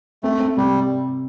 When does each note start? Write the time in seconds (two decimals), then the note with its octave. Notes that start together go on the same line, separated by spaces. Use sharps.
0.23 A3 C4
0.39 C4
0.57 C3 G3